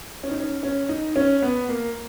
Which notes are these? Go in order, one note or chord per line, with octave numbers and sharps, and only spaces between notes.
C#4
D#4
C#4
C#4
D#4
C#4
B3
A#3